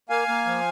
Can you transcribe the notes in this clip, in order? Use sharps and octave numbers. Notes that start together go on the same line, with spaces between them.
A#3 F5 G#5
A#3
F3